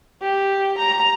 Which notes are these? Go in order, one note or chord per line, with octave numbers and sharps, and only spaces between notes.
G4
A#5